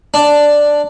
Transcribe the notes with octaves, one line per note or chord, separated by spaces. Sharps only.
D4